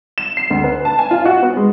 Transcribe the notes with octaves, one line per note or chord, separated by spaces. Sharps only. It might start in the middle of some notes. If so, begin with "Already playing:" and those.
E7
C7
D2
B4
A5
G#5
F4
F#4
B3
G#3